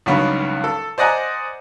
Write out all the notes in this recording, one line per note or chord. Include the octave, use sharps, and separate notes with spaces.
C#2 G2 D#3 F#3 B3
A4
C5 D5 D#5 F#5 G#5 A#5